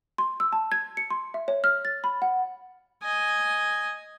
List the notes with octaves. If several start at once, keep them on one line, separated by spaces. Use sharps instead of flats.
C6
E6
A5
G#6
C#7
C6
E5
C#5
F6
A6
B5
F#5
D#5 G#5